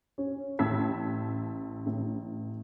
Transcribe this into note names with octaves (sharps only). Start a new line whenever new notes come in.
C#4
A1 A5 E6 G#6 B6
A1